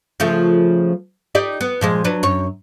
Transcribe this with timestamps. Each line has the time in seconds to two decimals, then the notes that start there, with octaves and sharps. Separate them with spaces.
0.20 C#3 F3 A3
1.35 D#4 G4 D5
1.61 B3
1.81 A#2 F3 G#3
2.04 F#3 D4 B4
2.23 F#2 C#5